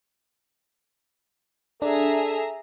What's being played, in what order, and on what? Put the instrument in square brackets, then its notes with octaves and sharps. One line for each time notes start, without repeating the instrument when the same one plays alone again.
[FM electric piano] D4 [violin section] G#4 E5 A#5 [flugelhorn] A4